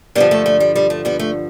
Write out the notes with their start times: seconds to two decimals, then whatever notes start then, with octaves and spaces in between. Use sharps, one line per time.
0.15 G2 D3 F3 G3 B3
0.31 A3
0.46 A3
0.60 G3
0.75 G3
0.90 A3
1.05 G3 B3
1.19 A3